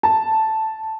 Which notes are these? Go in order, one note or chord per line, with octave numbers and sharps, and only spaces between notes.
A5